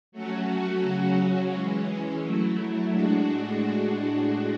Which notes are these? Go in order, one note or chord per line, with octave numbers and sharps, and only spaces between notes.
F#3 A3 C#4 F#4
C#3 F#3 C#4 F#4
E3 G#3 C#4
F#3 A3 E4
A2 G#3 D4 F#4